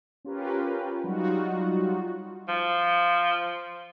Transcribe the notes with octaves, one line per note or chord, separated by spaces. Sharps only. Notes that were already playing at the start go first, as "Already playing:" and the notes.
C#4 F4 G4 A#4 B4
F#3 G3 D#4 F4 F#4
F3